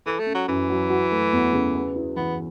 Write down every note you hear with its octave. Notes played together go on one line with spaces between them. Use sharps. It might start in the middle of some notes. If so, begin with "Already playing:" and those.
E3 A4
A3
C#4
F#3
F#2 E3
F#3
F#4
A3
E2
C#3
B4
E4
E3 B3